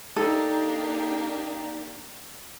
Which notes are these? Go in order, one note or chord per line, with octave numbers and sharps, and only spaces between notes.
A#3 D4 D#4 G4 A4